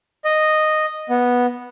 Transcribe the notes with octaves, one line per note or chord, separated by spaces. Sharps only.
D#5
B3